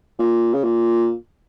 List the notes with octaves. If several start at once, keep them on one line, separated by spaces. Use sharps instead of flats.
A#2
C#3
A#2